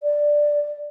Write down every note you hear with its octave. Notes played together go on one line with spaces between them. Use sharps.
D5